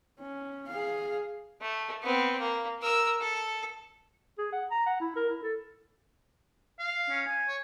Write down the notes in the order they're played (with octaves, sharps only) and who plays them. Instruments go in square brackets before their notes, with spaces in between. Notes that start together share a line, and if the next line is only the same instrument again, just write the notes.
[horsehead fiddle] C#4
G#4 F5
[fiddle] A3
B3 C4
A#3
A#4 E6
A4
[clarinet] G#4
F#5
A#5
F#5
E4
A#4
E4
A4
[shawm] F5
[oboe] C#4
G#5
[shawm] C#5